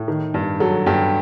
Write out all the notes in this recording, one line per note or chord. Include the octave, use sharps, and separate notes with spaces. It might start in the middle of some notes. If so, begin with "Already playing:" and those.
Already playing: A2
D#3
G2
F#3 A4
G2 G4